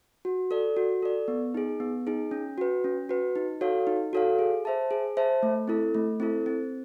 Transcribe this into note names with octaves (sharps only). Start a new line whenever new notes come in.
F#4
A4 D5
F#4
A4 D5
B3
D#4 G#4
B3
D#4 G#4
C#4
F#4 B4
C#4
F#4 B4
D#4
F#4 A4 C#5 F5
D#4
F#4 A4 C#5 F5
G#4
C5 E5 A5
G#4
C5 E5 A5
A3
C4 E4 A4
A3
C4 E4 A4
C4